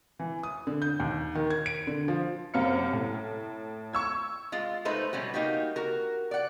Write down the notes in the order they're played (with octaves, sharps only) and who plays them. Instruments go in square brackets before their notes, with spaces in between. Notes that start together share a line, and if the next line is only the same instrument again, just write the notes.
[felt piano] E3
D#6
D3
G6
D#2
D#3
G#6
D7
D3
F3
[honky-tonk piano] F#2 C3 A#3 C4 F6 C#7
A2
C#6 E6 G#6
[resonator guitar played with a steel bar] G#3 F4
G#3 A3 D#4 B4 C5
B2 G3 C#4 F#4
A#3 D#4 F#4 G4
F#4 A#4
D5 F#5